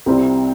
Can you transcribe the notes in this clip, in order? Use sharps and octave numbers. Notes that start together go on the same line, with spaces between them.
C2 C3 G3 C4 E4